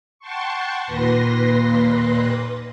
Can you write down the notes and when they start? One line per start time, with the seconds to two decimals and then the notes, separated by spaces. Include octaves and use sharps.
0.19 F#5 G5 A5 C6 C#6
0.85 D#2 A#2 B4 C6 A#6